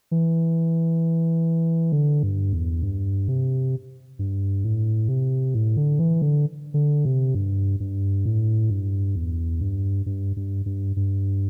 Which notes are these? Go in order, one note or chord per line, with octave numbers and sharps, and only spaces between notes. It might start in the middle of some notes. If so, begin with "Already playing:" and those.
E3
D3
G2
E2
G2
C3
G2
A2
C3
A2
D3
E3
D3
D3
C3
G2
G2
A2
G2
E2
G2
G2
G2
G2
G2